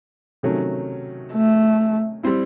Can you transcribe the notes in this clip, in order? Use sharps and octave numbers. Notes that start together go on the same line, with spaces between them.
C3 D#3 F#3 A3 C#4
A3
G3 C4 E4